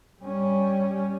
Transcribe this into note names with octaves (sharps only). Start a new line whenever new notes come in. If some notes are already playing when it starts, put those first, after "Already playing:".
G3 C#4